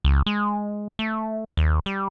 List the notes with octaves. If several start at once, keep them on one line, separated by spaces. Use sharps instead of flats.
C#2
G#3
A3
D#2
G3